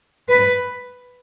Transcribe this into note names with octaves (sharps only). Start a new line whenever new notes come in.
B4